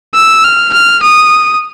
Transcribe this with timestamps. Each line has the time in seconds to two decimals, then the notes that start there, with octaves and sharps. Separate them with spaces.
0.14 E6
0.44 F6
0.73 F6
1.03 D#6